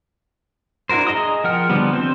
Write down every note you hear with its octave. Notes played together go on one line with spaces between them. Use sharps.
D4 E4 F#4 A#4 C5
G#4 D#5 A#5 D#6
F3 A#4 F#5 G5 F6
D3 F3 G3 B3
C4 C5